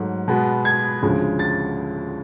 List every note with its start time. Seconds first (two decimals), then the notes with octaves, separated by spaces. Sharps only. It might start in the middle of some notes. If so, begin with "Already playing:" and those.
Already playing: G#2 F#3 A3
0.28 B2 G#3 B3
0.65 G#6
1.02 D2 C#3 F3 G#3
1.39 A6